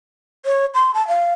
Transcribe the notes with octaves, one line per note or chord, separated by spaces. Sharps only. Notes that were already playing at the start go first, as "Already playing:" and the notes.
C#5
C6
A5
F5